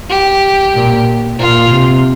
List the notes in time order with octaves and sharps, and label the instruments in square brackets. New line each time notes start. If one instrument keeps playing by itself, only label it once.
[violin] G4
[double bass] A#2
[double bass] A#2 [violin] F4
[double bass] C3